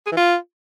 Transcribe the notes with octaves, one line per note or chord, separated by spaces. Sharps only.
G#4
E3
F4